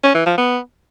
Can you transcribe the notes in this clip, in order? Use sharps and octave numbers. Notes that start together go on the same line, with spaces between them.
C#4
E3
F3
B3